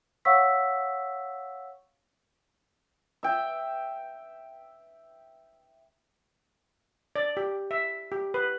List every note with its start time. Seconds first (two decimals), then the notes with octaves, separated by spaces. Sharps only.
0.25 C#5 F5 F#5 C#6 E6 B6
3.23 E5 G5
7.16 D5
7.37 G4
7.71 E5
8.12 G4
8.34 B4